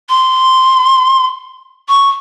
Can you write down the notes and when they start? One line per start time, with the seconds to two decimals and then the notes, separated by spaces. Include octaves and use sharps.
0.09 C6
1.88 C#6